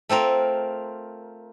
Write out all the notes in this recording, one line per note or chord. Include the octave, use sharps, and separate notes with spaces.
A3 C4 F4 A#4